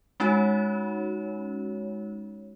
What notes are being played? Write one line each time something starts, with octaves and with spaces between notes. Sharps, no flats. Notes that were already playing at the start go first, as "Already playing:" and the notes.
G#3 C#4 D#4 F#4 C#5